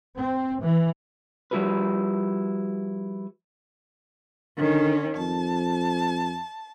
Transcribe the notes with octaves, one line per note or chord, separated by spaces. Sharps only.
C4
E3
F3 G3 E4 F#4 A#4 B4
D3 D#3 C#4
F2 A5